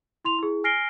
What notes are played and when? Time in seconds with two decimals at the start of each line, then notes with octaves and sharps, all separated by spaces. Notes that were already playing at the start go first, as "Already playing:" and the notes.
0.25 E4 C6 F7
0.38 E4 G#4
0.64 G#5 F6 A#6 C7 D7 G7